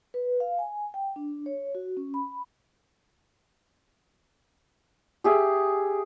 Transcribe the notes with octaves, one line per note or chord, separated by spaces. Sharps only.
B4
F5
G#5
G5
D4
C#5
F#4
C#4
B5
G4 G#4 E5